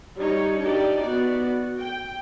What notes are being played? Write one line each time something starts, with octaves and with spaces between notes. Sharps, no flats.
G3 D#4 C#5
D4 D#4 G4 D5
B3 F#4 D5
F#4
G5